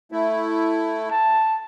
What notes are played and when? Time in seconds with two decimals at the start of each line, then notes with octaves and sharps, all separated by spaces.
0.12 A3 E4
1.11 A5